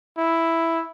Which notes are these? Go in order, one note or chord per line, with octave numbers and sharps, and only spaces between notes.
E4